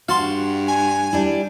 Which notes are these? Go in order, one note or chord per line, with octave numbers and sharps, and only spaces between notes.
G2 F#4 F5 A5 C6
G#5
G3 D4 E4